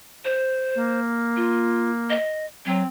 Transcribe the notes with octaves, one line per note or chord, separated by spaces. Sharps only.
C5
A#3
F4
D#5
F#3 C4